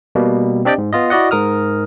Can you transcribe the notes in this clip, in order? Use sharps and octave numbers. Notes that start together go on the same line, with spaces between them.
B2 G3 A#3
C4 D4 G4 D5 D#5 G5
G#2
B3 F4 D#5
E4 F#4 D5 D#5 F#5
G#2 A#4 D#6 F6